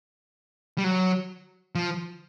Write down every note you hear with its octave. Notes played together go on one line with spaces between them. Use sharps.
G3
F#3
F3